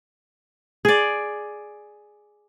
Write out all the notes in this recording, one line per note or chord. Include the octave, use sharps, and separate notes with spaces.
G#4 D5